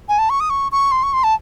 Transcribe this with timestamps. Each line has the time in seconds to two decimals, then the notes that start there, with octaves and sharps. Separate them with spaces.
0.09 G#5
0.19 A5
0.30 C#6
0.40 D#6
0.50 C#6
0.72 C#6
0.92 C6
1.03 C#6
1.13 C6
1.24 A5